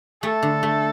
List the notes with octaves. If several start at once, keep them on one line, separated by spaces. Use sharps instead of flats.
A3 A4
D3
A3